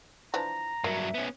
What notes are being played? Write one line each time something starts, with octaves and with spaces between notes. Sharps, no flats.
E3 F3 D4 A#5
G2 F#3 A#3 E5
B3 C#4